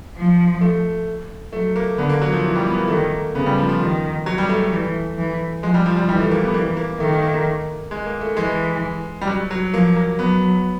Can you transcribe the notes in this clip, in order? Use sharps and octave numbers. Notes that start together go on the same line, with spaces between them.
F3
A3
F#3 A3
A#3
D3 B3
A#3
F#3
F3
E3
G3
B3
A#3
D#3 A3
A#3
C#3 B3
G3
F3
F3
D#3
F#3
G3
A3
A3
E3
E3
F3 G#3
G3
F3
G3
E3 G3
A3
A#3
B3
E3 A#3
A#3
D#3 A3
A#3
A#3
A#3
G#3
A#3
A3
E3 G#3
G3
F#3
F#3
F3 A#3
A#3
F#3 B3